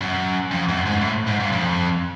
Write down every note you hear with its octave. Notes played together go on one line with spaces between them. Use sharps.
F#2
F2
F#2
G#2
A2
G#2
G2
F2